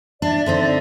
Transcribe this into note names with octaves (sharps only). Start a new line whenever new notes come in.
D4 D5 E5
D3 C4 D#4